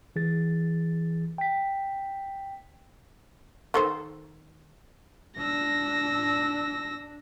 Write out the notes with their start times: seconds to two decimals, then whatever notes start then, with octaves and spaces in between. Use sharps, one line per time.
0.16 E3 G#4 A6
1.38 G5 B6
3.74 D#3 A4 C5
5.38 D4 E6 A#6